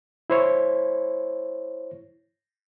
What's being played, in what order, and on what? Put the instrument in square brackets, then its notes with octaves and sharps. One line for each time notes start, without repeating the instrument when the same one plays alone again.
[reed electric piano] E4 C5 C#5